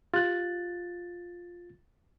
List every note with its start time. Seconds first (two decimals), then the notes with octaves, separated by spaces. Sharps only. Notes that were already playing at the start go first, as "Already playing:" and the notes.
0.14 F4 G4 F#6 A6